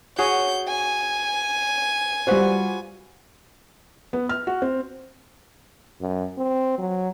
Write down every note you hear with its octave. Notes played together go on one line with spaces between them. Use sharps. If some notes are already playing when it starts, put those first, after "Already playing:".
F#4 G#4 C#5 G6
G#5
G3 F4 F#4 B4 C5
B3
F6
F#4
C4
F#2
C4
F#3